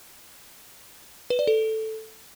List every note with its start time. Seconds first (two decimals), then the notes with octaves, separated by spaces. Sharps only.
1.30 B4
1.39 D5
1.47 A4